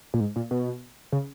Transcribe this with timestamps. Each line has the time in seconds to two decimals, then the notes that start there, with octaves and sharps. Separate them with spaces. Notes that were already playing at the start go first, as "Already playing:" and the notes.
0.14 A#2
0.20 G#2
0.36 A#2
0.51 B2
1.12 C#3